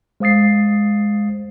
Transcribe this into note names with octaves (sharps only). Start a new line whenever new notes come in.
G#3 C5 F5 D#6 A6 C7